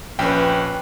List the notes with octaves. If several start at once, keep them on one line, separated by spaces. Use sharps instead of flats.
A#1 C#4 B4 G5